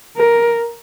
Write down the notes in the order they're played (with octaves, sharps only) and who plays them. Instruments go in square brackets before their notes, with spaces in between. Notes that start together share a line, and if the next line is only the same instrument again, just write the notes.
[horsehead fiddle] A#4